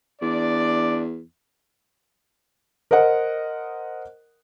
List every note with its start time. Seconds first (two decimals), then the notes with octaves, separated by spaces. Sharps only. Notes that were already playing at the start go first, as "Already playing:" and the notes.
0.22 E2 D4 D5
2.91 A#4 C5 D#5 F#5